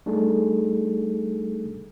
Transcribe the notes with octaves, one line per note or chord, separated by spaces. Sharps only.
G3 A3 D4 D#4 G#4 A4